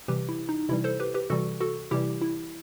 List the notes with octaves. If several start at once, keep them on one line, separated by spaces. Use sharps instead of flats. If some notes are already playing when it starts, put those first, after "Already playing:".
C3 E3 G3 G4 B4
E4
D#4
C3 E3 G3 E4
A4 C5
G4 B4
G4 B4
C3 E3 G3 F#4 A4
F#4 A4
C3 E3 G3 E4 G4
E4